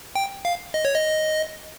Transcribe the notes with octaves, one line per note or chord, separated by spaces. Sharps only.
G5
F5
D#5
C#5
D#5